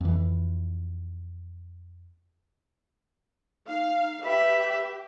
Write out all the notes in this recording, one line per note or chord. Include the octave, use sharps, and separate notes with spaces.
F2 E3
D#4 F5
G4 B4 E5 B5